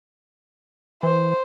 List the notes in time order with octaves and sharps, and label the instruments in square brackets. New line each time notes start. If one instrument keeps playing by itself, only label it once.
[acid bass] E3 [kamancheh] C5